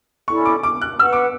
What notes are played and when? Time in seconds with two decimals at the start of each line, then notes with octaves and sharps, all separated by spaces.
0.28 C#4 E4 A4 D5 C#6
0.46 D6
0.63 D6
0.82 F#6
0.99 B4 F#5 C#6 E6
1.13 D6